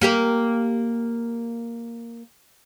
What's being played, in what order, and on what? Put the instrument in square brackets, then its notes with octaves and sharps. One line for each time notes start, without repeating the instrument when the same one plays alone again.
[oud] A#3 G4 A#4